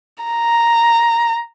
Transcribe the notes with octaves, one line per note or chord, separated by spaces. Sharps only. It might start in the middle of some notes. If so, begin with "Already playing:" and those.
A#5